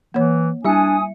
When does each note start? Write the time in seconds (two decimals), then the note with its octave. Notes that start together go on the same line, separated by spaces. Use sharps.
0.14 E3 A#3 C#5
0.65 G3 D4 E4 E5 G#5 D#6 C#7